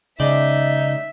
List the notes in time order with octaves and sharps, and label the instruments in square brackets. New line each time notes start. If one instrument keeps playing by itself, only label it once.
[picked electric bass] C#3 [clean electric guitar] G#3 D5 [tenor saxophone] D#4 [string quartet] E5